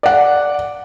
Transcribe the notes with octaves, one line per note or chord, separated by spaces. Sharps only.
D5 F#5